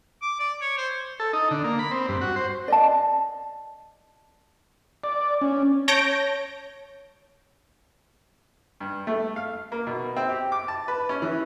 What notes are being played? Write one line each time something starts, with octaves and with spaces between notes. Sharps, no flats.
D6
D5
C#5
C5
A4
D#4
D3
A#3
B5
C4
G2
F#4
C5
D5 D#5 A5
D5
C#4
C#5 A5 G6 A#6 D7
G2
A3
F5
A#3
B2
C4
G4
D6
A5
B4
C#4
E3